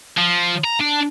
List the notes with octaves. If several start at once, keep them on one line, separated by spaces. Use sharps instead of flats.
F3
A#5
D4